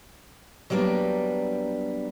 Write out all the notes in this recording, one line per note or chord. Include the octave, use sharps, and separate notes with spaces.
F#3 G3 A#3 B3 D4